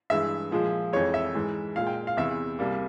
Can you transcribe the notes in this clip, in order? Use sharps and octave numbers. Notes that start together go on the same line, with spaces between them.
G2 E3 G#3 E5
A#2 F3 G#3
F2 E3 G#3 C#5
E5
G#2 E3 G#3
A#2 G#3 F5
G5
F5
E2 C3 E3 E5
C2 C3 G3 A#3